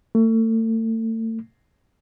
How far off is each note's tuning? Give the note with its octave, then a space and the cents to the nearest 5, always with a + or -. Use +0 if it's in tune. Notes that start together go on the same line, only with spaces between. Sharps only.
A3 +35